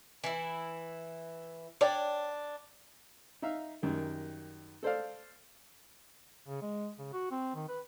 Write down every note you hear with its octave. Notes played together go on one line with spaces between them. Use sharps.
E3 E4
D4 C#5 D5 G5
D#4 E5 F5
F#2 D#3 G3
A4 C5 D5 F5
C#3
G#3
C#3
F#4
C4
D#3
B4